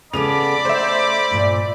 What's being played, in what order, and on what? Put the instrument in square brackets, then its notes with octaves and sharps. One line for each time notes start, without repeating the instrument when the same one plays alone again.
[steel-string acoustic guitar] C#3 B3 A4 [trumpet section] D5 B5 D6 [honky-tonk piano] F7
[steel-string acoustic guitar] A3 [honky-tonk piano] C5 E5
[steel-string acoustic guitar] G2 A#2